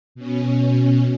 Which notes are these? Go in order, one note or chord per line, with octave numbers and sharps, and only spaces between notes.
B2 C#4